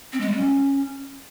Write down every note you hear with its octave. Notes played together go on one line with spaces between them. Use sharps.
C4
G#3
G3
C#4